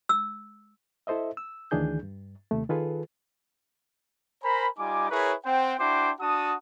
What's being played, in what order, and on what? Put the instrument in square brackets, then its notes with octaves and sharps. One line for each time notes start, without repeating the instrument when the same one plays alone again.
[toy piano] E6
[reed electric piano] E4 A4 C5 D#5 E5
E6
D2 D#3 E3 D4 G#4 G6
G2
D#2 C3 A3
D#3 F4 G#4 A4 B4
[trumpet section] A#4 C5 G#5 A#5 B5
G3 D#4 F4 G#5 D6
E4 G#4 A#4 B4 C#5
C4 C5 F#5 G5
D4 E4 F#4 C5 G5 D6
D4 F#4 F#5 A5 D#6